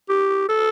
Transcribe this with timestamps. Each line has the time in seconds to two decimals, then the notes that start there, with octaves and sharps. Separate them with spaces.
0.09 G4
0.49 A4